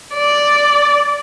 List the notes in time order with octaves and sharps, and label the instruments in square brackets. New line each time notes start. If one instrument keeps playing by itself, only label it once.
[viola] D5